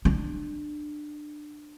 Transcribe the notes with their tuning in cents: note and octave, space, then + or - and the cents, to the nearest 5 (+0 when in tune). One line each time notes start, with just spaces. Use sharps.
D4 +20